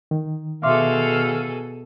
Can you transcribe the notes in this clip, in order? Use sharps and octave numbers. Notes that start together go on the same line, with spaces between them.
D#3
B2 G#4 A4 E5 F5 C6 D6